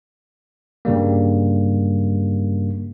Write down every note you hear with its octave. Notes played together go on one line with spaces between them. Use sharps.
G2 C#3 G3 A#3